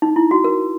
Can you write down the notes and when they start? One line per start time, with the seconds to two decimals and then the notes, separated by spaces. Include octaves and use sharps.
0.02 D#4
0.16 E4
0.31 F#4
0.44 A#4